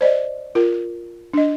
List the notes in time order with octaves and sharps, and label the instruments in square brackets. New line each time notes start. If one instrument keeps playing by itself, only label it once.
[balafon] C5 D5 D#5
F4 A#4
D4 D#5